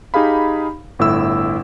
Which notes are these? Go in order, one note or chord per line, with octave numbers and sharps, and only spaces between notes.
D#4 G4 G#4 F5 B5
G1 A2 E4 E6